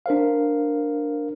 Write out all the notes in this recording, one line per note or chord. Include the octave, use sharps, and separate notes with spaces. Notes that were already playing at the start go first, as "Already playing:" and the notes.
D4 A#4 C5 F5